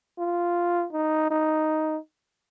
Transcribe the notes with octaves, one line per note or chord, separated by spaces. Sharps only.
F4
D#4
D#4